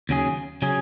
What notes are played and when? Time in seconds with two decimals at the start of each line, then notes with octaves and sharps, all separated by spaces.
0.09 D#2 C#3 F#3 C#4 G#4
0.62 C#3 F#3 C#4 G#4